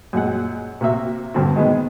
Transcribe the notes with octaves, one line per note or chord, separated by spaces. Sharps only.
F#2 A#2 G#3 F#5
C3 A#3 F#4 E5
G2 D3 B3 C4 F#4
D#3 G#3 B3